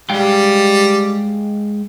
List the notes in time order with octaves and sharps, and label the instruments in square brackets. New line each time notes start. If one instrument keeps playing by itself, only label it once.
[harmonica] G3 [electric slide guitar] G#3 F5 G5